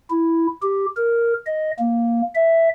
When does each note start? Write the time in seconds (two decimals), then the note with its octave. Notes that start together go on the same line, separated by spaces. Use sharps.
0.10 E4
0.62 G4
0.96 A#4
1.47 D#5
1.79 A#3
2.35 E5